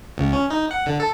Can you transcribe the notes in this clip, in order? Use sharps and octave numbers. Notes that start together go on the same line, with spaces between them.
C#2
C#4
D#4
F#5
D3
A4